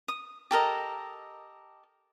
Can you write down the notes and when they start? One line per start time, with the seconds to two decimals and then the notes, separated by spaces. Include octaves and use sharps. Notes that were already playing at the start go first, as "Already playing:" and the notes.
0.08 D#6
0.51 G4 A4 A#4 D#5